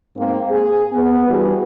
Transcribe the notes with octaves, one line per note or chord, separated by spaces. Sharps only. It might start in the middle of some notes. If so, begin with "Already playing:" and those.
G#2 A#3 C4
G#4
B3
E3 G3 D4 F#4 G#4 B4